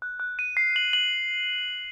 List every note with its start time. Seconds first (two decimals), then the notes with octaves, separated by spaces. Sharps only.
0.02 F#6
0.20 F#6
0.39 D#7
0.57 C7
0.76 F#7
0.93 F#7